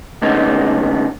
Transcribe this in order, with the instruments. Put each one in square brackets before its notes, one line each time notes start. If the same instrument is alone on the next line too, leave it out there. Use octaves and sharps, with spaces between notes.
[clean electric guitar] A2 D3 G#3 B3 C#4 D#4